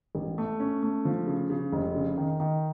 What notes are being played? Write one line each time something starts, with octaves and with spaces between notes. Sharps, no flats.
A1
A3
C#4
A3
F3
C#3
C#3
F1
C#3
D#3
D#3